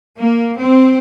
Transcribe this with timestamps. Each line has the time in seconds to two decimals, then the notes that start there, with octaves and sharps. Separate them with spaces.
0.17 A#3
0.56 C4